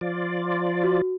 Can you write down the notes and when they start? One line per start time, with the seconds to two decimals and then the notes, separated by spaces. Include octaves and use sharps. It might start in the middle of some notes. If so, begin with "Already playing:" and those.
0.01 F3 F4 D5
0.83 F#4